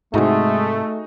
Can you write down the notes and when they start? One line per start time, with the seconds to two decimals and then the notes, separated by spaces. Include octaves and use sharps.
0.14 G#2 C3 G#3 A3 D#4 F#4 G#4